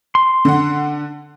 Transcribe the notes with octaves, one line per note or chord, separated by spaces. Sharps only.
C6
D3 F#5